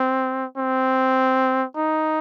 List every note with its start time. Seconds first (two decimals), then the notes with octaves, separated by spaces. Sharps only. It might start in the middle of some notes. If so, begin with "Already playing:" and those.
Already playing: C4
0.57 C4
1.75 D#4